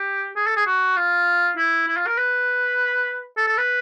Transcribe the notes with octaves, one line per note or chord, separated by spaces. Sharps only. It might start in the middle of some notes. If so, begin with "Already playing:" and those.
Already playing: G4
G#4
A4
G#4
F#4
F4
E4
E4
F4
A#4
B4
A4
A4
B4